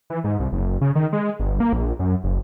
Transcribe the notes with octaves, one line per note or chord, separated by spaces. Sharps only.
E3
G#2
C2
F#1
C#3
D#3
G#3
G1
A#3
A#1
F#2
F#1